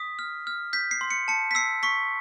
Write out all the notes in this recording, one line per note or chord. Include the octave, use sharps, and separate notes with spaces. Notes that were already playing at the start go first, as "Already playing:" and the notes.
Already playing: D#6 B6
F6
F6
G6 B6
C7
C6
C#7
A5 C#7
B6
E6 C7
C#6 B6